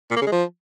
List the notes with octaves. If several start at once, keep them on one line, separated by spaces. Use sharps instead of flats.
A#2
A#3
C#3
G#3
F3